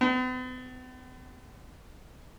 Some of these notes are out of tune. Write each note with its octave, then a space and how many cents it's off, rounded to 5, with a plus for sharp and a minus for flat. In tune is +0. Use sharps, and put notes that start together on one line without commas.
B3 +45